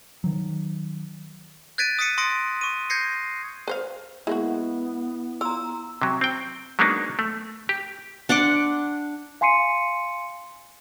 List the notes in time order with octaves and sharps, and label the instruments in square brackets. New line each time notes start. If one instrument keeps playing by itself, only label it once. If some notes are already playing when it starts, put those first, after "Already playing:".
[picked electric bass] D#3 F#3
[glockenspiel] F#6 G#6 A6 B6 D7 D#7
D#6 A6 B6 C#7 D#7
C6 D#6 A6 A#6 C#7 D7
C#6 D#7
G6 G#6 A#6 C7 C#7
[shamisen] B4 C5 F5
[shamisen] G#3 A#3 F#4 [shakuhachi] B3 [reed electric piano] E4
[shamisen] F4 [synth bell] A#5 E6
[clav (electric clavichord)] C3 F#3
C4 G5
F#3 G#3 A#3 B3 D4 D#4
A3
G4
[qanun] D4 F#5 C6 D6
[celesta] F5 G#5 C6 C7 C#7 D#7